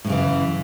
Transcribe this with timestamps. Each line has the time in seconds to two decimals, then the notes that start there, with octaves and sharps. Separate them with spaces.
0.05 A2
0.07 F#2
0.10 C#3
0.12 E3